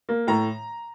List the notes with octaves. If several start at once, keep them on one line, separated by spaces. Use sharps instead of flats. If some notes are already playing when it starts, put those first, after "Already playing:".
A#3
A2 A#5